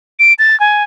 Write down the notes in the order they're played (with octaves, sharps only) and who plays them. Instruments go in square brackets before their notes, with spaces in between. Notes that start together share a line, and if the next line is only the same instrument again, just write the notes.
[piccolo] D7
A6
G#5